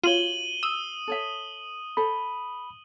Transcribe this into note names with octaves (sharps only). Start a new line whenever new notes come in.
F4 F#4 C#5 D#7 F#7 G7
D#6 E6
A4 C#5 E5
A4 C5 B5